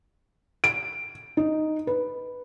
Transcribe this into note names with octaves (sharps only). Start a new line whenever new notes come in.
D7
D#4
B4